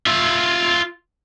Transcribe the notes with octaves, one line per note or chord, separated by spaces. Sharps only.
F4 E5